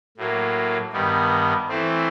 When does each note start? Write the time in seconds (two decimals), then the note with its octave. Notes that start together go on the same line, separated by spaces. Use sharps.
0.17 A2 F#3 A#3
0.93 G2 D#3 G3 B3
1.68 E3 A3 C4